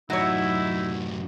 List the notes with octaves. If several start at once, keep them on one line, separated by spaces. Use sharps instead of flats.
F#2 A2 F#3 D#4 E4 C#5